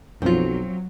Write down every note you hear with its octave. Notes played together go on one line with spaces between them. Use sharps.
B1 F#2 F3 F#3 C4 F4